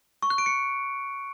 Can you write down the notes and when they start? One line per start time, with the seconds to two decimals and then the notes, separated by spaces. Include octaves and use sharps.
0.23 C#6
0.30 F#6
0.38 D7
0.46 C#7